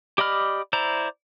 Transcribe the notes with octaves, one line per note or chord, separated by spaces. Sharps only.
G4 D5 D#5 B5 F6
E4 C5 D5 A#5